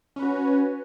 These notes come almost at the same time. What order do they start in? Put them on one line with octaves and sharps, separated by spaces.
C#4 B4 F#4